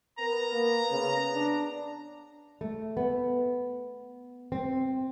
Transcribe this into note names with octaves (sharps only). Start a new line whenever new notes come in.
B3 A#4 A#5
A#3
C#3
D4
A3
B3
C4